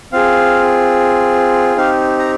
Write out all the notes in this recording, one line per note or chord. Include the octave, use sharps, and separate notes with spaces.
C4 F4 G#4 F5
C4 D#4 G4 F5
A#5